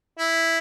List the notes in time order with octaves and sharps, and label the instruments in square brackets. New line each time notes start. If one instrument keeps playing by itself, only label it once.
[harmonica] E4